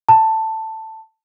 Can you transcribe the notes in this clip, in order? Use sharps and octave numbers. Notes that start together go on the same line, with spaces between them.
A5